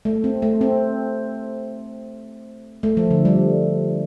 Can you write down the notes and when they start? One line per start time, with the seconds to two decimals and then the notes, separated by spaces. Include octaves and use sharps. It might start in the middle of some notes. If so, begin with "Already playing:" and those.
0.05 A3
0.24 C4
0.42 A3
0.61 C4
2.83 A3
2.97 F3
3.11 D3
3.25 G3